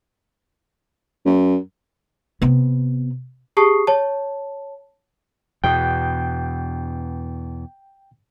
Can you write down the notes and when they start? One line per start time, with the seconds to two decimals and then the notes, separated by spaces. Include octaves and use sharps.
1.25 F#2
2.42 C3 B3
3.57 G4 G#4 A5 C#6 D#6 C7
3.87 C#5 A5
5.64 E2 B2 G5 G6